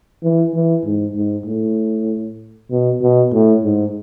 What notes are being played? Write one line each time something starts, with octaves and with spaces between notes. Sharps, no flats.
E3
E3
G#2
G#2
A2
B2
B2
A2
G#2